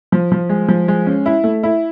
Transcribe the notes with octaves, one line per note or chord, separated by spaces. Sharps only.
F3
F3
G#3
F3
G#3
C#4
E4
A3
E4